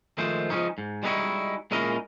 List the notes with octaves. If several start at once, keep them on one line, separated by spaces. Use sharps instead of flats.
D#3 F3 G#3 A3 C5
F3 F#3 G#3 C#4 D#4
G#2
G3 G#3 B3 D#4 E4 F#4
A#2 G#3 C#4 E4 A#4 D#5